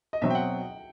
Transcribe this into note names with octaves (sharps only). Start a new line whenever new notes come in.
D#5
B2 F#3 C4 E5
G5
F#5